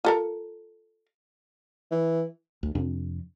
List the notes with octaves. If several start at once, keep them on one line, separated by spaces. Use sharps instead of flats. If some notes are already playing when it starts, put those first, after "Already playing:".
F4 A4 A#4
E3
D2
F2 C3 C4 D4